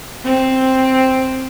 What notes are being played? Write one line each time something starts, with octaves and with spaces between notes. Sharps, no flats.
C4